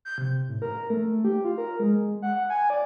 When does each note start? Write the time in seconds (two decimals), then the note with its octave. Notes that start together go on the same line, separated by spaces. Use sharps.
0.05 G6
0.18 C3
0.48 A2
0.62 A#4
0.90 A3
1.24 G4
1.44 F4
1.58 A#4
1.80 G#3
2.22 F#5
2.50 G#5
2.70 D5